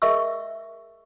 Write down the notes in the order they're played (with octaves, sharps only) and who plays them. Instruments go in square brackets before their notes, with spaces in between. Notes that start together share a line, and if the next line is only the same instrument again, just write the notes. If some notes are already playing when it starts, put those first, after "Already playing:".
[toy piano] G#4 A#4 D#5 E5 C#6 E6